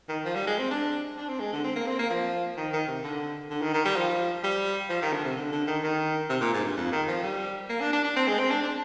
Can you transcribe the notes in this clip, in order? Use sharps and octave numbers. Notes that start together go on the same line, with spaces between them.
D#3
F3
G3
G#3
C4
D4
D4
C4
G#3
D3
C4
A#3
C4
A#3
F3
D#3
D#3
C3
D3
D3
D#3
D#3
G3
F3
G3
F3
D#3
D3
C3
D3
D3
D#3
D#3
C3
A#2
G#2
G2
F2
D#3
F3
G3
A#3
D4
D4
D4
C4
G#3
C4
D4
D4